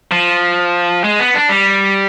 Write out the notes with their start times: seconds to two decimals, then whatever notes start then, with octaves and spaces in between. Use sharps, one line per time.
0.11 F3
1.04 G#3
1.20 B3
1.34 D4
1.49 G3